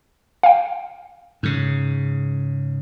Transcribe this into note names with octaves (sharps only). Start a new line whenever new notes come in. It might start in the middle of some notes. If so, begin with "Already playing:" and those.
F5 G5
G#2 C#3